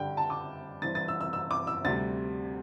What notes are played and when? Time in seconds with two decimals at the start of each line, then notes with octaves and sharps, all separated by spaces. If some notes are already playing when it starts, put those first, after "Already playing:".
Already playing: G2 D3 G3 G5
0.17 A5
0.30 D6
0.82 G2 E3 C4 A6
0.95 A6
1.08 E6
1.21 E6
1.33 E6
1.51 D6
1.67 E6
1.84 D2 C3 G3 A6